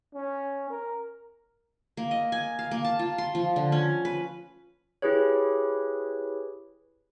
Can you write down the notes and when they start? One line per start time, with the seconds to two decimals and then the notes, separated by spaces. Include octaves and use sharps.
0.14 C#4
0.70 A#4
1.97 A#3
2.11 D#5
2.32 G#5
2.59 F5
2.71 A#3
2.84 A5
2.99 F4
3.18 C6
3.35 F3
3.56 D3
3.72 C#4
4.05 B4
5.02 E4 G4 G#4 B4 C#5